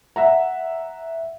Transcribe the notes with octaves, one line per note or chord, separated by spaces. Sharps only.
E5 F#5 A#5